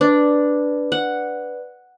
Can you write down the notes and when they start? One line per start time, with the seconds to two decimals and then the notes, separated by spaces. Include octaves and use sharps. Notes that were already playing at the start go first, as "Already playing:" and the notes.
0.01 D4 B4 D5
0.92 F#5